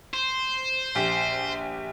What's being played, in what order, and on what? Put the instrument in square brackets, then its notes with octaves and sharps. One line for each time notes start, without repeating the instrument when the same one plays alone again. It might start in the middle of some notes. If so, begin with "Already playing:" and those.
[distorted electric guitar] C5
[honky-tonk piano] A#1 G4 B6